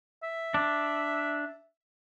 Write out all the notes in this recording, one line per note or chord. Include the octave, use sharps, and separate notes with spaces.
E5
D4